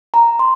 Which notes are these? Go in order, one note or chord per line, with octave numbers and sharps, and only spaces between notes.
A#5
C6